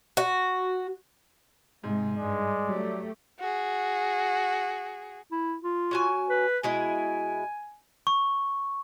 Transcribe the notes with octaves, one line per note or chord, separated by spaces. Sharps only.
F#4
G#2 C3 G#3
G2 G#3 D5
F#3 A3 G4
F#4 G#4
E4
F4
C#4 F#4 G#5
B4
B2 G#3 E4 G#5
C#6